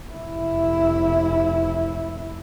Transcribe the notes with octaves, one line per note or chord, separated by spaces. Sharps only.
F1 E4